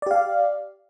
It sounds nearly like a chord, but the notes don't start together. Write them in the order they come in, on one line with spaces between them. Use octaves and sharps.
D5 G4 F5